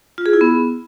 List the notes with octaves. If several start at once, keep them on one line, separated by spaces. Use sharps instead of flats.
F4
G#4
E4
B3